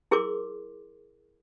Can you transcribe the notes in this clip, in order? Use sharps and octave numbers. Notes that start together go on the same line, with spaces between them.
E4 G#4 A#4 C6 D6